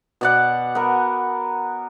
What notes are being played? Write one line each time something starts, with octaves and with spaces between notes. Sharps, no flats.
B2 D5 F#5
B3 A#4